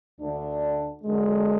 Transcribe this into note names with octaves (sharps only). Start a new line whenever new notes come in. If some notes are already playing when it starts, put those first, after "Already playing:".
D2 D3 A3 D4
F#2 D3 G#3